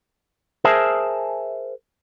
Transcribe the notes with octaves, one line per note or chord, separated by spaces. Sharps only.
G#4 A#4 C5 E5 G#5 A5